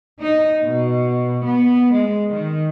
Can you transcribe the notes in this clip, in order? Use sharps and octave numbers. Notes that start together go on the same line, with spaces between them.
D#4
B2
B3
G#3
D#3